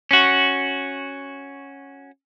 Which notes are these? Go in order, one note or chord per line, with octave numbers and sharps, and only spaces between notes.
C#4 F#4